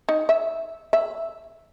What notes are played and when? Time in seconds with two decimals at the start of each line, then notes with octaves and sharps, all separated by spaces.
0.09 D#4
0.29 E5
0.93 E5